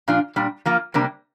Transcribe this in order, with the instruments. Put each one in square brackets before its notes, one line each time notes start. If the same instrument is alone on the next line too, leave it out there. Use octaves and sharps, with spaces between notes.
[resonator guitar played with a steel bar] A#2 F3 D4 F4
A#2 G3 D4
F3 A#3 F4
C3 G3 A#3 D4